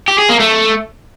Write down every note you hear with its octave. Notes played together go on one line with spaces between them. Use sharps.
G4
G#4
A#3
A3